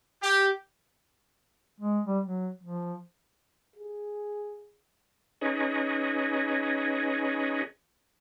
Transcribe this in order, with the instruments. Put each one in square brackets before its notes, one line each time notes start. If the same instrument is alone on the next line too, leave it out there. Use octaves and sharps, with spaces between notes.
[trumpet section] G4
[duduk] G#3
G3
F#3
F3
[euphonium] G#4
[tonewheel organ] C#4 D#4 G#4 B4 C#5 D#5